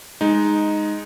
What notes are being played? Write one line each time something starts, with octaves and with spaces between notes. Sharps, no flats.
G#3 D#4